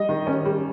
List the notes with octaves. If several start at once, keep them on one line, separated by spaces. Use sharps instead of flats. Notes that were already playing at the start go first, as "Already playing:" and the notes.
Already playing: G3 D#5
D#3
C#4
G3